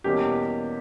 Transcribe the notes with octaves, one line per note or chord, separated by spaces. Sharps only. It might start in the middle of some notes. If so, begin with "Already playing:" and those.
E2 B2 G3 A#3 C#4 G4